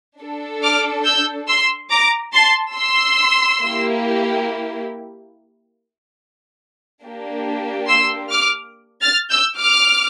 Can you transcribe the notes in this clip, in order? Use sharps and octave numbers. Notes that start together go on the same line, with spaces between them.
D4 A4
D6 F6
E6 G6
C6 E6
A#5 D6
A5 C6
C6 E6
A#3 E4 G4
A#3 D4 G4
C6 E6
D6 F6
F6 A6
E6 G6
D6 F6